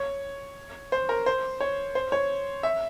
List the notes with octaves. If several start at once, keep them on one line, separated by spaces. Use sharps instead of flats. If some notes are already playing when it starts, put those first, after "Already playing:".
Already playing: C#5
C5
A#4
C5
C#5
C5
C#5
E5